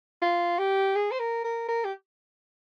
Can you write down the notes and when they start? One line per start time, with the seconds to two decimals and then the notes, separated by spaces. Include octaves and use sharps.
0.22 F4
0.59 G4
0.95 G#4
1.11 C5
1.19 A#4
1.44 A#4
1.68 A#4
1.84 G4